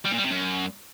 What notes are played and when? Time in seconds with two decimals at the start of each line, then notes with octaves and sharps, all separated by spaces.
0.05 G3
0.11 A#2
0.18 G3
0.24 C3
0.31 F#2